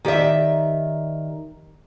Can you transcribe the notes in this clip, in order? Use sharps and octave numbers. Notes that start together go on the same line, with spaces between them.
D#3 G4 D5 E5